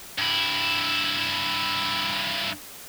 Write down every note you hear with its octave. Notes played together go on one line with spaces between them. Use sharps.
G2 E4